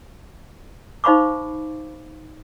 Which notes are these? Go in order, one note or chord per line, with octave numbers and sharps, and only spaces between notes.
D#4 C5 F5 B5 C#6 D6